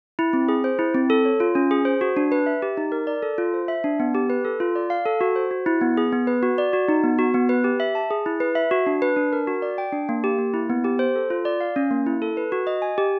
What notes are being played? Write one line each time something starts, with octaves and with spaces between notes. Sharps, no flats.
E4
C4
G#4
C5
E4
C4
A4
C#5
F4
C#4
G#4
C5
F#4
D4
B4
E5
G4
D#4
A#4
D5
A4
F4
C5
E5
D4
B3
G4
B4
A4
F4
D5
F5
A4
F#4
C5
F#4
E4
B3
G#4
B3
B4
F#4
D5
F#4
D#4
B3
F#4
B3
B4
G4
E5
A5
G#4
E4
B4
E5
F#4
D4
B4
D4
A#4
F#4
D5
G5
D4
A#3
G4
A#3
E4
B3
G4
C5
A4
F4
D5
F5
C#4
A#3
E4
A4
B4
F#4
D#5
G#5
G4